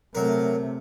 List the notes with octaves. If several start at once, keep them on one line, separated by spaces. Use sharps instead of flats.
C3 F#3 A3 A#4